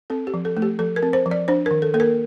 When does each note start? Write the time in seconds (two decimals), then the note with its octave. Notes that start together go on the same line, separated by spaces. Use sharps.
0.10 C4 A4
0.27 G4
0.34 F3
0.45 A4
0.57 A3
0.62 G4
0.79 F3 A4
0.96 A#4
1.03 C4
1.13 C5
1.26 F3
1.31 D5
1.48 D4 C5
1.66 D#3 A#4
1.82 A4
1.94 A#3 A4
2.00 A#4